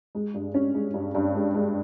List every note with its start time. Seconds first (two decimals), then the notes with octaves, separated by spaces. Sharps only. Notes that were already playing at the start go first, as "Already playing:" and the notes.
0.15 G#3
0.34 G2
0.54 C#4
0.74 G#3
0.94 G2
1.15 G2
1.34 G#3
1.54 G#3